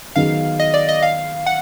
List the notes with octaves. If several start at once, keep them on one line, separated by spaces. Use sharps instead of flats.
D#3 F#3 B3 D#4 G#4 F5
D#5
D5
D#5
F5
F#5